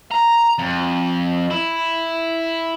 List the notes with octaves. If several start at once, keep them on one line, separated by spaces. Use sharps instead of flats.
A#5
F2
E4